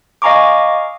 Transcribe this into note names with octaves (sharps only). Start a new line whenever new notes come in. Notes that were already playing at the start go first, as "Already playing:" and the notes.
D#5 F5 G#5 A#5 C#6 D6